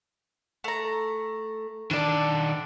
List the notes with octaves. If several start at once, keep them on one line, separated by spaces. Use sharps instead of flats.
A3 A#5
D#3 D4 D5 A5 D6